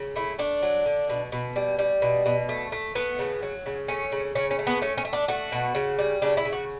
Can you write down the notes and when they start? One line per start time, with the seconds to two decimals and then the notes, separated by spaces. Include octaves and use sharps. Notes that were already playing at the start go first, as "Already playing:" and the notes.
Already playing: C#3
0.16 A3 E4
0.38 A3 D4
0.63 F#3
0.86 D3
1.10 B2
1.32 B2
1.56 G3
1.79 G3
2.02 B2
2.26 B2
2.49 A3
2.72 A3
2.95 A3 B3
3.19 C#3
3.43 F#3
3.66 C#3
3.88 A3 C#4
4.12 C#3
4.35 C#3 C#4
4.51 C#4
4.59 A3
4.67 B3
4.82 A3 C#4
4.98 C#4
5.05 A3
5.13 D4
5.28 A3 F#4
5.52 B2
5.75 C#3
5.99 G3
6.22 C#3 D4
6.37 E4
6.45 C#3
6.52 F#4